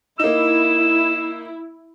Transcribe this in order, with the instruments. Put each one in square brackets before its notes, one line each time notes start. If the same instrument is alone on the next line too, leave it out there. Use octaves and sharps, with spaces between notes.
[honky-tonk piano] A#3 D#4 [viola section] E4 [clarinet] E6